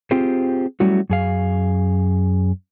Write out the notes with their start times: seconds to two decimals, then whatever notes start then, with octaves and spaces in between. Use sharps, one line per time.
0.11 C4 F4 G4 G#4 C5
0.80 F#3 G3 A3 C#4 E4 F#4
1.10 F#2 G#4 F5